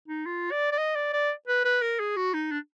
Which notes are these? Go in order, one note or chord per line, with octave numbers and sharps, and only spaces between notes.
D#4
F4
D5
D5
D#5
D5
D5
B4
B4
A#4
G#4
F#4
D#4
D4